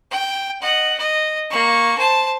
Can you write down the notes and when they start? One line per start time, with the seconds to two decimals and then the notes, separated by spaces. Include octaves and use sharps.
0.11 G5
0.61 D#5 F#5
0.98 D#5
1.50 A#3 C#6
1.98 C5 A5